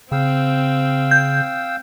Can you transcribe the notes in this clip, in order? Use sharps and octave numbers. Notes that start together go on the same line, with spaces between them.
C#3 C4 F5 G5 E6
G6